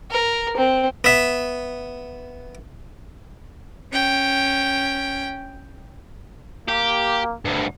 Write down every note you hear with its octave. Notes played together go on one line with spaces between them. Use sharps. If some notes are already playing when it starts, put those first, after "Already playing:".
A#4
C4
B3 E5
C#4 G5
A#3 G4
D2 G2